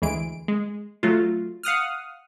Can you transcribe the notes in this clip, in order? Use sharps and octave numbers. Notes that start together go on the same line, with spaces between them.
D2 E3 G#3 D7
G#3
F#3 A3 F4
F5 F#5 D#6 F6